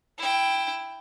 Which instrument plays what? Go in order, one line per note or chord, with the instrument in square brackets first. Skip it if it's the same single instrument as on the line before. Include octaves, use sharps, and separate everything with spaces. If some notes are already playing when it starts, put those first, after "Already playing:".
[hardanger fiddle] E4 G5